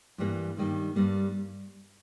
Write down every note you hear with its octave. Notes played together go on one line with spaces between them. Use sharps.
G2 E3 G3 A#3
G2 D#3 G3 A#3
G2 G3 A#3